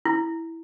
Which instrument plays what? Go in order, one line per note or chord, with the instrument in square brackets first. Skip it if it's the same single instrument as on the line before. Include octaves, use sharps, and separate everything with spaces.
[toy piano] E4